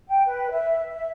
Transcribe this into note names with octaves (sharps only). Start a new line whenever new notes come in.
G5
B4
E5
E5